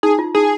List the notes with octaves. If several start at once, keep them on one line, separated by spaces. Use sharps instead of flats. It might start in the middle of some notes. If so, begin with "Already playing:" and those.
D#4 G#4
F4
D#4 G#4